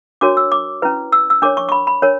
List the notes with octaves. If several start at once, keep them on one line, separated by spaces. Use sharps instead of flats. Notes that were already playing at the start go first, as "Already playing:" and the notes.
D4 F#4 A#4 C#5 D6
E6
D6
C#4 E4 B4
E6
E6
D4 A#4 C#5 D6
C#6
C#6
B5
B5
D4 A#4 C#5